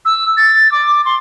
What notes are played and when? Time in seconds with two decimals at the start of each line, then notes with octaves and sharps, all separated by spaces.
0.05 E6
0.37 A6
0.72 D6
1.05 C6